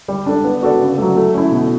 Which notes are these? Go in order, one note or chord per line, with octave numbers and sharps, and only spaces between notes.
G3
D4 A4 D5
B3
F#4 A4 D5
C#3
F#3 A3
A3
C#4 E4
B2